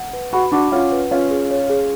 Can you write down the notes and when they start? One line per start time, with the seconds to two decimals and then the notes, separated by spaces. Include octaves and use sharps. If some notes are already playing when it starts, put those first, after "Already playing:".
Already playing: F#5
0.13 B4
0.33 F#4 B5
0.52 D4 F#4 D6
0.72 C#4 F4 F#5
0.92 B4
1.11 C#4 F4 F5
1.30 G#4
1.51 C#5
1.70 G#4